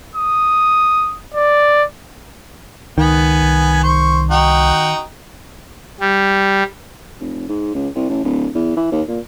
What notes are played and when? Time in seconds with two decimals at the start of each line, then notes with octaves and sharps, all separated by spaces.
0.16 D#6
1.34 D5
2.98 C#2 D#3 B3 G#5
3.42 C2
3.83 C5 C#6
4.31 D#4 F#4 G5
6.00 G3
7.20 F1
7.49 G#2
7.75 C#2
7.95 C2
8.09 A1
8.24 D1
8.55 E2
8.77 E3
8.92 D#2
9.08 A#2